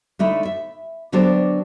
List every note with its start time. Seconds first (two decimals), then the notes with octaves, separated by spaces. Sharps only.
0.19 D3 A3 D#4 E4
0.45 E5
1.12 D3 F#3 B3 D4 G4 C5